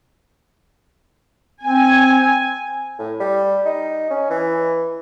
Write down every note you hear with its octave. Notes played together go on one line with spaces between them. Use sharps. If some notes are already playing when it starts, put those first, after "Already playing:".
C4 G#5
A2
G3
D#4
C#4
E3